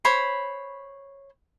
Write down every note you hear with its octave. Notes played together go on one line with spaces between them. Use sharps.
C5 C#5 B5